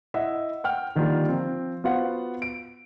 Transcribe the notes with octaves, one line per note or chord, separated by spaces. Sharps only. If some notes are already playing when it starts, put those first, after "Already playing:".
E4 D#5 E5 F#5
F#5 G5 F6
D3 D#3 G3 A#3 F4
F3 C4
B3 F4 F#4 C5 F5 F#5
D7